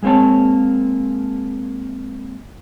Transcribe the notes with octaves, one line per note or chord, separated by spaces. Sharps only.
G#3 A#3 C4 C#5 A5